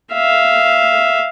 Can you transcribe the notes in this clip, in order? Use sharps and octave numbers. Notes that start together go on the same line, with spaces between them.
E5 F5